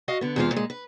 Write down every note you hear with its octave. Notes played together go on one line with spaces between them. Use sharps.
F#4 D#5 F5
D3 B3
E2 C3 G#3 A3 F4 F5
A#2 G#3
B4